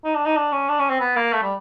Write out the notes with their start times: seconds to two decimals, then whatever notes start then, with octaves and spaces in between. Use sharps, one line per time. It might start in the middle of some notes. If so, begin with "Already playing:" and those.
0.05 D#4
0.15 D4
0.26 D#4
0.37 D4
0.52 C#4
0.69 D4
0.79 C#4
0.90 C4
1.00 B3
1.16 A#3
1.33 A3
1.43 G3